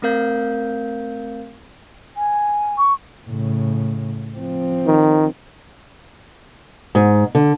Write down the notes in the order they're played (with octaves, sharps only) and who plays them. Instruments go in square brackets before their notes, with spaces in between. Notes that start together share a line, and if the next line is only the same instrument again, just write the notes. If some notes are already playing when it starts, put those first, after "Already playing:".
[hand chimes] A3 C4 A#4 F5 G6
[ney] G#5
[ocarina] C#6
[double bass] A2 C#3
F3 C4
[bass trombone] D#3
[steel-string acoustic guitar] G#2
D3